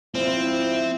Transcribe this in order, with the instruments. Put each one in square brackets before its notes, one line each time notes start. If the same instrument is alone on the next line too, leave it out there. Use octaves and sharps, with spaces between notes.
[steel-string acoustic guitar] G#2 F3 [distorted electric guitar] C4 [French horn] E4